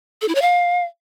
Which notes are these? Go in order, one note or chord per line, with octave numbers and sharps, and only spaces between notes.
A4
E4
C#5
F5